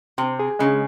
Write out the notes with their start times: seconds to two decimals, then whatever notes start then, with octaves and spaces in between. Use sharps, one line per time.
0.18 C3 C4
0.39 G#4
0.59 C#3 G#3